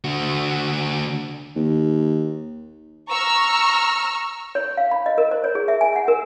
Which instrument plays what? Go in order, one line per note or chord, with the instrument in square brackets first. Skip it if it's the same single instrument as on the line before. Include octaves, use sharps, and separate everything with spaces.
[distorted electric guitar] D3 F#4
[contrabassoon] D#2
[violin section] A#5 C#6 E6 F6
[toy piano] C#5
F5
B5
D#5
A#4
C5
C#5
G#4
E5
G#5
F#5
A#4